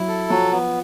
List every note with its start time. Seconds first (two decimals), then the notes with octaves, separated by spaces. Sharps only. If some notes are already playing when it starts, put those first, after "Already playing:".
Already playing: F#3 E4
0.08 A4
0.30 F3 F#3
0.51 B3